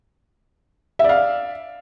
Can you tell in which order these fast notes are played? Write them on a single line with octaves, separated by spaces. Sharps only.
E5 D5 F5